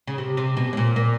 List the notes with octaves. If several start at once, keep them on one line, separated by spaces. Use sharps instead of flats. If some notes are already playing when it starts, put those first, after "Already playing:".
C#3
C3
C3
B2
A2
A#2
A#2